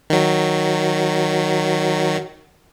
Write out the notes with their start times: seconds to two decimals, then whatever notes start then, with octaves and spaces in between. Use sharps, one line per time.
0.10 D#3 F#3